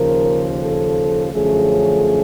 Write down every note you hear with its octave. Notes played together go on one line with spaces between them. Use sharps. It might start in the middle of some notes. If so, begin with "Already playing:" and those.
Already playing: D#2 C#3 F3 A#4
A4
F#2 D3 F3 A3 C#4 G#4